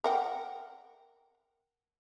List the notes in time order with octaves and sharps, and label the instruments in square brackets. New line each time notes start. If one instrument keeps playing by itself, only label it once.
[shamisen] A#4 F#5 G5